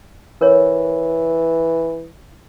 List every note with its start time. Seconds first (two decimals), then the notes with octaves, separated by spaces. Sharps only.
0.41 E3 A#4 C#5